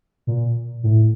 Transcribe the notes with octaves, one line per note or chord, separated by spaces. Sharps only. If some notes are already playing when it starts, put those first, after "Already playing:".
A#2
A2